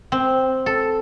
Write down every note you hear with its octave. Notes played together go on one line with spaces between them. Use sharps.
C4
A4